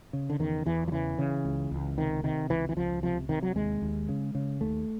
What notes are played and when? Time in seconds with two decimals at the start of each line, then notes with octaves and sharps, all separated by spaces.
0.13 C#3
0.30 D3
0.39 E2 D#3
0.66 E2 E3
0.88 F3
0.92 C#3 E3
1.18 C#3
1.45 C#2
1.71 C#2
1.97 C3 D#3
2.24 C3 D#3
2.50 C#2 E3
2.69 E3
2.76 C#2 F3
3.03 C3 F3
3.29 C3 D#3
3.43 F#3
3.56 D#2 G#3
3.82 D#2
4.09 C#3
4.35 C#3
4.61 D#2 A3